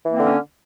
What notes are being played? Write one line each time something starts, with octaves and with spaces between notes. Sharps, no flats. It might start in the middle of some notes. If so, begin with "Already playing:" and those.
D3 E3 A#3 C4 C#4